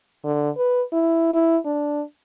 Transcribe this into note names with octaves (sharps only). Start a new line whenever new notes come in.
D3
B4
E4
E4
D4